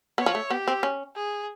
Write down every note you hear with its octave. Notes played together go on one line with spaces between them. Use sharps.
B3 C#5
F3
A3
B3 G4
C4
C#4
G#4